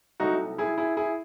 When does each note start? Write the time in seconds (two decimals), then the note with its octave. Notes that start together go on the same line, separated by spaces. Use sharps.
0.20 C2 C3 F#3 A3 D#4 F#4
0.58 E4 G#4
0.78 E4 G#4
0.97 E4 G#4